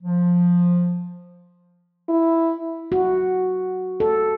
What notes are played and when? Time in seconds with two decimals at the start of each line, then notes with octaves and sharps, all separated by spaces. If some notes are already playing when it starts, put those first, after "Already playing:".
0.03 F3
2.09 E4
2.92 F#4
4.00 A4